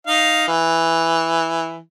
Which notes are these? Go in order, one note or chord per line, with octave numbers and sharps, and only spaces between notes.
D#4 F5
E3